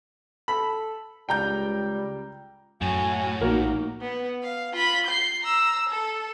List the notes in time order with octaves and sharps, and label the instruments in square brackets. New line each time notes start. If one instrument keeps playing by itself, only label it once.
[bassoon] A4 [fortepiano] B5
[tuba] C#2 [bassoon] G3 [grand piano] G5 A#5 G6
[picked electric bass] F#2 [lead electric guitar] A2 [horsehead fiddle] F#4 G#5
[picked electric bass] A#1 [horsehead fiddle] A#3 D#4 [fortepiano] F#4 A#4
[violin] B3
F5
F4 B5
G6 C7
A#5 E6
A4